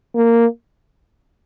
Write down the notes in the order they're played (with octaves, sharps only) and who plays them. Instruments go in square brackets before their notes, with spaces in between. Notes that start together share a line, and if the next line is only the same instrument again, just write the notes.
[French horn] A#3